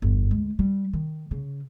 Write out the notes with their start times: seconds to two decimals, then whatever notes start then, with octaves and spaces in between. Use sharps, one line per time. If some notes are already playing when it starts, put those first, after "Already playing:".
0.02 G1 E2
0.31 D2 G#3
0.59 G3
0.93 D#3
1.31 C#3